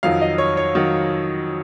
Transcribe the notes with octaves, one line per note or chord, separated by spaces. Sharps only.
F2 D#3 F#3 F5
D#5
C#5
C#5
D#3 F#3